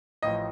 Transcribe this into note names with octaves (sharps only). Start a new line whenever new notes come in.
A1 A2 F3 D#5